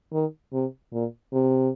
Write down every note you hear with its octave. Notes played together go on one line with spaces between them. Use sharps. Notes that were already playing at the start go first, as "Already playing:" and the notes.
D#3
C3
A#2
C3